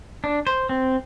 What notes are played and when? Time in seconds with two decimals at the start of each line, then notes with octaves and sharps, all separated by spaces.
0.24 D4
0.47 C5
0.69 C4